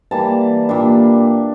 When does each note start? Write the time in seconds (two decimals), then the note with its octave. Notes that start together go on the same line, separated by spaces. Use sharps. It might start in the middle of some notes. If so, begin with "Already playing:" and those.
0.11 E3 G3 A#3 A5
0.69 A#2 G3 D4